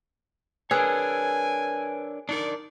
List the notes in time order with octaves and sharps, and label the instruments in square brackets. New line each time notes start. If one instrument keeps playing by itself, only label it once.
[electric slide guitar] D4 A#4 C#5 [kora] G#4 [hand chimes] B4 E6 F#6 [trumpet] G#5
[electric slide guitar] D4 D#4 A#4 [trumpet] D5